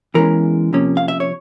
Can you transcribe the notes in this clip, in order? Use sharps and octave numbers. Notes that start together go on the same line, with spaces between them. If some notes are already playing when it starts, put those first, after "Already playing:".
E2 E3 G#3 C#4 A#4
C3 F3 A#3 C#4
F5
E5
C#5